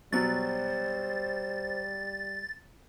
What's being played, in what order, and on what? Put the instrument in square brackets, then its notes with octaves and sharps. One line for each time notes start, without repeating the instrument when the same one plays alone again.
[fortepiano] B2 F#3 [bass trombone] G3 [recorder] C5 [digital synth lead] A6